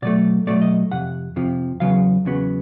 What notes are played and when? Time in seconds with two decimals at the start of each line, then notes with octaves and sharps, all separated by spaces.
0.02 B2 F#3 A3 D5
0.47 B2 F#3 A3 D5
0.62 D#5
0.92 F2 C3 F#5
1.36 F2 C3 F3
1.80 E2 C#3 F#3 B3 F5
2.25 E2 C#3 F#3 B3